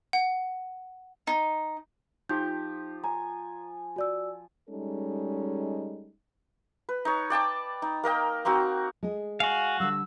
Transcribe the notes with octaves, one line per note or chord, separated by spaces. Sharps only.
F#5
D#4
F3 D#4 G4 G6
G#5 A#5
F#4 D5 E6
G3 G#3 C#4 D#4 A4
B4
D#4 C#5
D5 G5 A5 D6
D#4
A#3 A#4 D#5 G5
A#3 C4 D#4 F#4
G#3 G#4
F#4 F5 G#5
D3 G3 E6